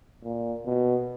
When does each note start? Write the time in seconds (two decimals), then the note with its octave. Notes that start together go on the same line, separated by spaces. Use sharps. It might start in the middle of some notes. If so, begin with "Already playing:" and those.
0.24 A#2
0.65 B2